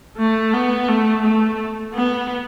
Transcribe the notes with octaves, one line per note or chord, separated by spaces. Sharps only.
A3
B3
A3
A3
B3